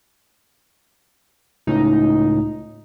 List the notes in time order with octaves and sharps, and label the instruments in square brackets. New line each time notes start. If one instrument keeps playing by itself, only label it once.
[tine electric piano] C#2 A2 [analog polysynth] D#4